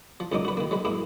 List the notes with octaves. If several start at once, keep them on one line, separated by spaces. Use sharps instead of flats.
F3
C#2 A#2 F#3 D#4 D6
F#4 B4
D#3 A#3
F#3 G#3 B4
G#2 A#3 E4